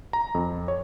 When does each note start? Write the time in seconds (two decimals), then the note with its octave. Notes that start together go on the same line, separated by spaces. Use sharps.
0.13 A#5
0.35 F2
0.68 C#5